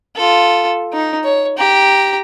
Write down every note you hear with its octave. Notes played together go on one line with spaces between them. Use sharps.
F4 A4
D#4
C#5
G4 A#5